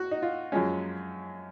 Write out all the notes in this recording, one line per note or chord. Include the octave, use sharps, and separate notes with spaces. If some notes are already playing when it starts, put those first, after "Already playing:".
Already playing: F#4 F#5
D#4
F4
F#2 F3 G#3 C#4